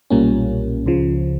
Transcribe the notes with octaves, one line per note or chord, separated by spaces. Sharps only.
B1 A#2 G3 A#3 C#4
C#2 C#3 F3